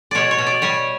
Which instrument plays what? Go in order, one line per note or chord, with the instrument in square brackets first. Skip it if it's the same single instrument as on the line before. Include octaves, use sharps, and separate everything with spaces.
[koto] B2 C#5 D5
C#5
B2
D5
G3 C#5